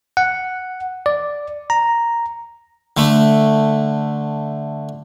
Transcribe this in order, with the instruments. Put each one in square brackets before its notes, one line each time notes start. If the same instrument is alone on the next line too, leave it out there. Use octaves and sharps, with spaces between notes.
[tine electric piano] F#5
D5
A#5
[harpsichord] D3 A3